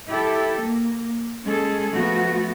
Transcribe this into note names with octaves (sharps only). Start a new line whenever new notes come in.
E4 G4 A4
A#3
G#3 C#4 G#4 A4
F3 A3 B3 F#4